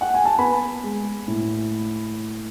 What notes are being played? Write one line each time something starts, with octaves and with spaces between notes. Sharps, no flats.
F#5
G#5
A5
B3 G#5 B5
G#3
A2